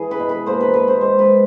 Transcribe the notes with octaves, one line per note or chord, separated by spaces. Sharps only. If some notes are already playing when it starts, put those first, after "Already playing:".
Already playing: E3 G#4
B4
B2
B4
A#3 C5
B4
B2 B4
C5
G#3 C5
B4